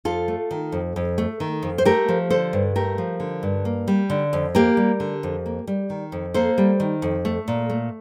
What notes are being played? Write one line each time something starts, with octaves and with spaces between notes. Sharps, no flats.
F2 F4 A4
A3
D#3
F2
F2
A3
D#3
F2
C5
A3 G4 A#4
F3
D3 A4 C5
G2
A3 G4 A#4
F3
D3
G2
A#3
G3
D3
F2
A#3 G4 A#4
G3
D3
F2
A#3
G3
D#3
F2
A#3 A4 C5
G3
D#3
F2
A3
A#2
A3